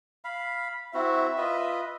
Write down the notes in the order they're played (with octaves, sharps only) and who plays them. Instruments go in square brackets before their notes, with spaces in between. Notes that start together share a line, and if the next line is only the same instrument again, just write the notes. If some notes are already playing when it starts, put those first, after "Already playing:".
[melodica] F5 B5
[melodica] C4 E4 F#4 [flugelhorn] E5
[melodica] F4 B4 D#5